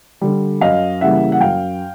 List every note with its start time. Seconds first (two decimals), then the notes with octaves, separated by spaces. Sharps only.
0.21 D3 G3
0.61 F#2 D#5 F5
1.01 C#3 E3 G3 A#3 E5 F#5
1.32 F#5
1.41 F#2 F5 G5